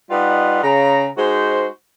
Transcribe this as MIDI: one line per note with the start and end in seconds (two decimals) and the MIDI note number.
0.11 0.63 55
0.11 0.63 63
0.11 0.63 65
0.11 0.63 71
0.11 0.63 75
0.11 0.63 78
0.63 1.08 49
0.63 1.08 82
1.18 1.67 56
1.18 1.67 63
1.18 1.67 66
1.18 1.67 72